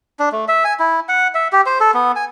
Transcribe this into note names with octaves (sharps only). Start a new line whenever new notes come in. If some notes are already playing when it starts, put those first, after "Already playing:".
D4
A3
E5
G#5
E4
F#5
E5
G4
C5
A4
B3
G#5